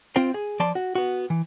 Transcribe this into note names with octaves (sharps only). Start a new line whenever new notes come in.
C4 F4 C5 G5
G#4
F3 D5 A5 C6
F#4
B3 F#4
E3